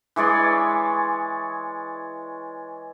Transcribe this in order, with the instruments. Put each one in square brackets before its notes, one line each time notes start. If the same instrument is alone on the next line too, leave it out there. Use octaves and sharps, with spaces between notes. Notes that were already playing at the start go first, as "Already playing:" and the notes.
[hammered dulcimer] E3 G#3 C#5 D5